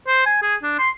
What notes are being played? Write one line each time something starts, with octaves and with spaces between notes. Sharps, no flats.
C5
G#5
G#4
D4
C6